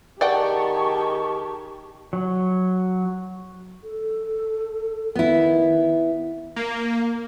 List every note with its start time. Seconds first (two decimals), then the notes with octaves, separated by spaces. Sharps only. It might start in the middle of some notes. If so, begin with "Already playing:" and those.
0.21 D#3 G4 G#4 D5 F#5 G5 A5 C#6
2.13 F#3
3.83 A4
5.15 D#3 B3 E4
6.56 A#3